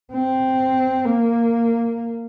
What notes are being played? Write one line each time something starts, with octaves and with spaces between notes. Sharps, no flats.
C4
A#3